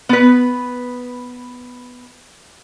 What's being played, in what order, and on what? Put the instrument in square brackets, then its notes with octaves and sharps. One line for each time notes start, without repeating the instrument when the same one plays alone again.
[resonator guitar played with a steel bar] B3 B4